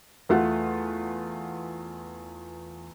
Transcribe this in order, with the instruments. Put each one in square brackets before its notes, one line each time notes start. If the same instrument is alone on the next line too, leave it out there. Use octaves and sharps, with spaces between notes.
[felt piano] E2 A3 F4 F#5